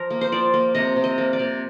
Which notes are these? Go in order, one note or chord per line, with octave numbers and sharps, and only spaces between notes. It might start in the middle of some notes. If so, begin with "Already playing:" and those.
Already playing: F3 A#4
A#3
C5
F3 D5
A#3
C3 D#5
C3
D#5
A#3
D5
C3